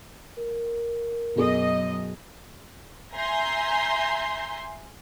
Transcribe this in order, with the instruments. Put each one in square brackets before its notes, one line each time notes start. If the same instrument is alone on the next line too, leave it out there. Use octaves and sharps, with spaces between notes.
[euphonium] A#4
[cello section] F#2 D#5 [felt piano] B2 G#4
[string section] E5 G#5 A#5 C6 G6